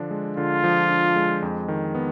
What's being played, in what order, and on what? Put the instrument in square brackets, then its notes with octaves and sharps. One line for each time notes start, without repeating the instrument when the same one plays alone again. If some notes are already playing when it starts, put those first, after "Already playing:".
Already playing: [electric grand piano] D3 F3 D4
G#3
[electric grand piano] D3 [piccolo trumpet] F4
[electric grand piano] F3
D4
G#3
F2
D#3
B3